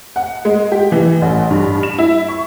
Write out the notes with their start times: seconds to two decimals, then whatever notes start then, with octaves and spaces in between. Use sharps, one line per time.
0.16 F#5
0.45 G#3
0.72 G4
0.92 E3
1.22 A1
1.51 G2
1.83 E7
1.98 E4
2.28 C#6